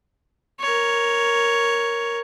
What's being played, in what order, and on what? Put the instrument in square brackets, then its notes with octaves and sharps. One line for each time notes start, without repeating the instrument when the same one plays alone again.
[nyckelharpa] A#4 C#5